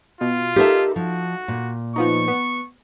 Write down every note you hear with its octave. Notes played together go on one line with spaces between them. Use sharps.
B2 F4
D#4 G4 A4 A#4 E5
F3 F#4
A#2
F3 B3 D#4 C#6
B3